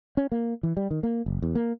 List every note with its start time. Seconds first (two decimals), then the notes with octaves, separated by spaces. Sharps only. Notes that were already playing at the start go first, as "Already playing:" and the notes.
0.17 C#4
0.32 A#3
0.63 E3
0.77 G3
0.91 D#3
1.03 A#3
1.26 F#1
1.42 E2
1.55 A#3